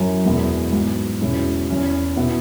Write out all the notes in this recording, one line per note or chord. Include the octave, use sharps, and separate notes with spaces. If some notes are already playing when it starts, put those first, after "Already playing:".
Already playing: F#2 F#3 C#4 E4
E2 B2 G#3 B3 E4
G#2 F#3 B3
E2 B2 G#3 C#4 E4
E2 E3 C#4 E4
B2 B3 E4